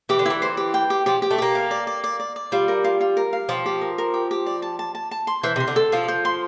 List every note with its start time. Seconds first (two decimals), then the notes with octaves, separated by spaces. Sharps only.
0.09 E3 G4
0.19 D3
0.25 E3 E4
0.42 C5
0.57 G4
0.74 G5
0.90 G4
1.06 F3 G4
1.22 G4
1.31 A3
1.38 A#3 G4
1.55 F5
1.71 D5
1.87 D5
2.04 D5
2.20 D5
2.36 D5
2.52 G3 F4
2.68 A#4
2.84 F4
3.01 F4
3.17 A#4
3.33 F5
3.49 F3 G4
3.66 G4
3.82 A#4
3.98 A#4
4.14 G4
4.31 G4
4.46 D5
4.62 A5
4.79 A5
4.95 A5
5.11 A5
5.27 C6
5.43 E3 C5
5.56 C3
5.60 C6
5.67 D3
5.76 A4
5.92 F3 F5
6.08 C5
6.25 C6